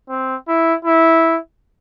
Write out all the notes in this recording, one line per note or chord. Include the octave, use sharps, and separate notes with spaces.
C4
E4
E4